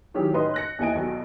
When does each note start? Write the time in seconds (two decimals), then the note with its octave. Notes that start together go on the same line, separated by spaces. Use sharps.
0.14 D#3 E3 F#3 C#4 G4 G#4
0.33 A2 C#4 D#4 B4 D#5 C6
0.54 F#6 A#6 C#7
0.79 D#2 E3 E4 D#5 G#5 D7
0.95 B1 E2 B2